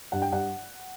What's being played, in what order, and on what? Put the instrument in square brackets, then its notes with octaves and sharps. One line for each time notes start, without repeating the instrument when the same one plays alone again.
[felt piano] G2 F#5
G5
G2 F#5